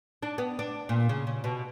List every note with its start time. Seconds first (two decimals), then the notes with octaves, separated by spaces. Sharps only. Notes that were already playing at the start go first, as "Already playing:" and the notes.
0.23 D4
0.38 B3
0.59 D4
0.89 A#2
1.09 C#3
1.27 C#3
1.44 B2